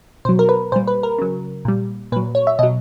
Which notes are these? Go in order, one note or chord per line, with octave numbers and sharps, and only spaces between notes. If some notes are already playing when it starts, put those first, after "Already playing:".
B2 F#3 C5
A#4
B4
A#2 G3 C5
B4
A#4
C#3 F#3
A#2 G3
A#2 F#3 B4
C#5
E5
B2 F#3 D#5